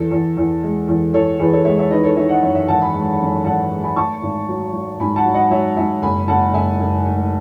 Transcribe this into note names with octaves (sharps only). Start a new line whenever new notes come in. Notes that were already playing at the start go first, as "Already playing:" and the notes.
Already playing: E2 A4
E2
E2
G#3
E2
E2 A4 C#5
E2 G#4 B4
A4 C#5
G#3 C#5 E5
C#5 E5
D#3 B4 D#5
A4 C#5
D#3 C#5 E5
D#5 F#5
F#2 C#5 E5
C#5 E5
G#1 F#5 A5
G#5 B5
G#3
F#2
G#1 F#5 A5
G#3
G#5 B5
A3 A5 C#6
G#1
F#3
F#3
G#2 G#5 B5
F#5 A5
F#3
D#5 F#5
F#3 C#5 E5
G#2 E5 G#5
F#1 G#5 B5
F#1 F#5 A5
F#1 E5 G#5
F#1
A3